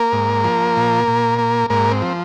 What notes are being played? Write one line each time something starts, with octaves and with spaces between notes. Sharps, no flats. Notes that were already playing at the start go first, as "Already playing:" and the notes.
Already playing: A#3 A#4
G#2
F3
A#2
A#2
A#3
G#2 A#3 A#4
C4
F3